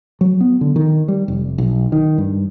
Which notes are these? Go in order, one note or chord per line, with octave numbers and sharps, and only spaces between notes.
F#3
B3
D3
D#3
G3
F1
B1
D#3
G2